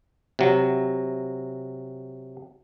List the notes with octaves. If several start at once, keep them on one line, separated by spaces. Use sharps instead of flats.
C3 F#3